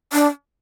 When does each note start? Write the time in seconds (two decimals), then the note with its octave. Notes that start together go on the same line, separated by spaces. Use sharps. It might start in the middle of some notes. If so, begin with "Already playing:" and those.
0.13 D4